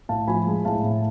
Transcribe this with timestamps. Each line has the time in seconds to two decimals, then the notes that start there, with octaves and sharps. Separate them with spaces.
0.09 A2 F5 A5
0.27 F3 G#5 B5
0.47 G#3
0.65 A2 F5 A5
0.84 A2